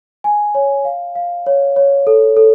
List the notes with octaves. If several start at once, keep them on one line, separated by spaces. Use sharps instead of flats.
G#5
C#5
F5
F5
C#5
C#5
A4
A4